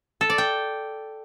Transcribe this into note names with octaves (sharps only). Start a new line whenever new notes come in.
A4
D5
G5